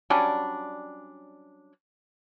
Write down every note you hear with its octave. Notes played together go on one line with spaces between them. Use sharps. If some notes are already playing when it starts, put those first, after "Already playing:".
F#3 G3 C#4 D4